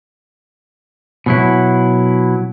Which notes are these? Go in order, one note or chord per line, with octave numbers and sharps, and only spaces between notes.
B2 F#3 E4